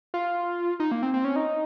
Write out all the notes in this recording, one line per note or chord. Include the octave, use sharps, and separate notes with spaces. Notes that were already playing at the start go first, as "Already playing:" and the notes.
F4
D#4
A#3
C4
C4
C#4
D#4